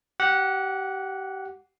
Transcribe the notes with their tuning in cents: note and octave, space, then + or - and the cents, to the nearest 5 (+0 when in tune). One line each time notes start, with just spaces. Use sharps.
G4 -30 F#5 -5